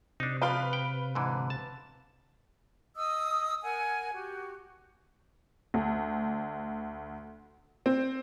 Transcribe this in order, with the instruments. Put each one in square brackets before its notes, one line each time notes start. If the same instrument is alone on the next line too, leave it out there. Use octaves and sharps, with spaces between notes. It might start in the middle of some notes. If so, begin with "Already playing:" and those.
[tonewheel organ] C3 [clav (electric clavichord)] D4 D#4
[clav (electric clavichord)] F3 G5 [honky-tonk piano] B4 F5
[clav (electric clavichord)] G5
G#2 D3 E3
A5
[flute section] D#5 D#6 E6
A#4 F#5 G#5
F#4 G4
[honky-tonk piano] D2
C4